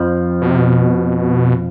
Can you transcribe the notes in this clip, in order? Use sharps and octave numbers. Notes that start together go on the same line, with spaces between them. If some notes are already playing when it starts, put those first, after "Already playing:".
Already playing: F2 F3
B2
C3
B2